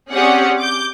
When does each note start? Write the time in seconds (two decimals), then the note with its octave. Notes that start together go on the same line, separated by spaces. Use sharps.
0.11 C4 C#4 G4 G#4 D5 F#5
0.59 D6 G6